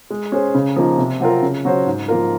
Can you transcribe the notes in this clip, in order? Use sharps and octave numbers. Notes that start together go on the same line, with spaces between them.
G#3
C#4 G#4 C5
C#3
F3 A#3 D#4
C3
F#3 C4 F4 A#4
C#3
F#3 C#4 F#4 C5
G#2
F3 A#3 F4 A#4